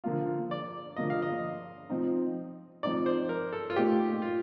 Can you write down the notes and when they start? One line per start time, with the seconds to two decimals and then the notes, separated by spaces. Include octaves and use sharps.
0.04 D3 F3 A#3 F4
0.51 D5
0.96 D3 F3 A#3 F4 D#5
1.10 F5
1.22 D#5
1.89 F3 C4 D#4
2.83 F3 C4 D#4 D5
3.06 C5
3.29 A#4
3.53 A4
3.70 F4
3.76 A#2 A3 D#4 G4
4.22 F4